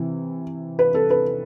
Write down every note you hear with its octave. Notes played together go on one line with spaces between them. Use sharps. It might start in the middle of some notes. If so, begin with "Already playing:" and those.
Already playing: C3 E3
B4
A4
B4